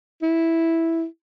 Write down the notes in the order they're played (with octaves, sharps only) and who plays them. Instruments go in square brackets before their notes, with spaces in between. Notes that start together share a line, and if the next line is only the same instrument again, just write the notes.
[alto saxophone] E4